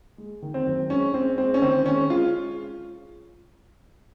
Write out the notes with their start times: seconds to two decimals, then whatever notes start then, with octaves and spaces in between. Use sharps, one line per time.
0.18 G#3
0.42 D#3
0.54 C4
0.67 F#2
0.90 G#3 C#4
1.14 G#3 C4
1.38 G#3 C4
1.54 C#4
1.62 D#3 C4
1.86 G#3 C#4
2.10 G#3 F4